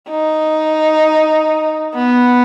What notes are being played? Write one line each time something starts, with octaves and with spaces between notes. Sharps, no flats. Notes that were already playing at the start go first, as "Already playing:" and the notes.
D#4
B3